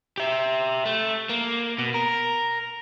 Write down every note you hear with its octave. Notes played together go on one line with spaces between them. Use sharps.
G4 E5
A3
A#3
B2
A#4